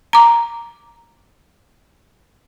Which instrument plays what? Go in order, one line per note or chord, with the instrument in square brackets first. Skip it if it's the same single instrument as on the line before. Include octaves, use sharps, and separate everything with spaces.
[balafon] A#5 D6